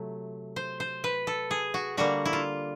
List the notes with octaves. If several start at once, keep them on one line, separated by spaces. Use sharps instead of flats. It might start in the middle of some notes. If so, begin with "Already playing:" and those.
Already playing: C3 F#3 A3
C5
C5
B4
A4
G#4
F#4
D3 G3 A#3 F#4
E4
F4